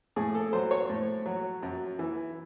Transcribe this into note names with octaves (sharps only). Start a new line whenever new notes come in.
A2 G#4
A4
F#3 C5
C#5
A2
F#3
F#2
E3